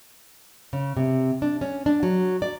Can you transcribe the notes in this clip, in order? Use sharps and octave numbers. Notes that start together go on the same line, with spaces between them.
C#3
C3
D4
C#4
D4
F#3
D5